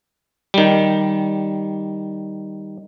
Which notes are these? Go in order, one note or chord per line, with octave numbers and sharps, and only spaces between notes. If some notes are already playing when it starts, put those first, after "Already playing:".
D#3 G3